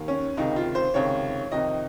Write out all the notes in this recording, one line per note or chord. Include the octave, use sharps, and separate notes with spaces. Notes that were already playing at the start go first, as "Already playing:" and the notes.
Already playing: D#2 D#3
C#4
C#2 C3 D#3 D#4
F4
C5
C#2 C3 D#3 C#5
F2 C3 D#3 D#5